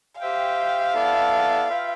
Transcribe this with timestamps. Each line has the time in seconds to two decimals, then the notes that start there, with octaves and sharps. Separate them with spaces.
0.20 G4 C5 E5 F5 G5
0.94 B3 E4 A4 D5 A5
1.68 F4 B4 E5 G5